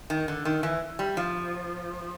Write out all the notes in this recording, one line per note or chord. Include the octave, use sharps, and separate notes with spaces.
D#3
D3
D#3
E3
G3
F3